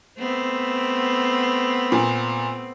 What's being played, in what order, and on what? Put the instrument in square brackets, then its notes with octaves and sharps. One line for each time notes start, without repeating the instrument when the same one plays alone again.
[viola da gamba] A3 B3 C4
[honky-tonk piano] A#2